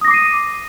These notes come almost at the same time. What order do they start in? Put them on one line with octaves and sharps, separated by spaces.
D#6 A#6 D6 C7 D#7